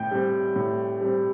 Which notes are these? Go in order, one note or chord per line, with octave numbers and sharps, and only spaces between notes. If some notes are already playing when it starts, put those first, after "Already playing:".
Already playing: A2 G5 G6
G3 C4
A2
G3 C4